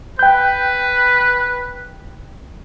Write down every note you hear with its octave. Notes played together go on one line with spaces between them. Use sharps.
B4 G5 G6